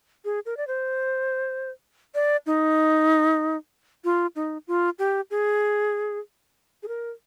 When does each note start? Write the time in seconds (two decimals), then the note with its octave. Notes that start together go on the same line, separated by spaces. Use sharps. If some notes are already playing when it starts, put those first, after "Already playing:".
0.25 G#4
0.46 A#4
0.57 D5
0.67 C5
2.15 D5
2.46 D#4
4.04 F4
4.36 D#4
4.68 F4
4.99 G4
5.31 G#4
6.83 G#4
6.88 A#4